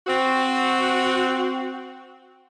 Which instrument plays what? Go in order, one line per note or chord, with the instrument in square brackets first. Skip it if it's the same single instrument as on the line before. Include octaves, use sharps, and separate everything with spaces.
[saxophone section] C4 F#4